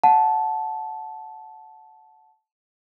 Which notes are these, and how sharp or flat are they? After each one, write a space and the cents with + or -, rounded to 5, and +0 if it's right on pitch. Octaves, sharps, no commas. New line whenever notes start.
F#5 -15 A5 -10